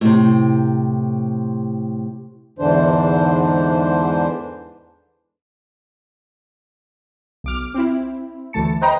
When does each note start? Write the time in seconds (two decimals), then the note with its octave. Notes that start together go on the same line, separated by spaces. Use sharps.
0.01 A2 C3
2.59 E2 G#2 D3 E3 D4 C5
7.44 B1 D6 F6
7.74 C4 E4
8.53 D2 E3 A3 A5 C#7
8.81 B4 C5 D#5 G5 A#5